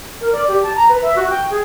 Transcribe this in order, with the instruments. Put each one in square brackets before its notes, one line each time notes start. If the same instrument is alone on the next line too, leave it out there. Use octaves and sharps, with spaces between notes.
[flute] A#4
D5
G4
A5
A#5
B4
E5
F#4
G5
G#4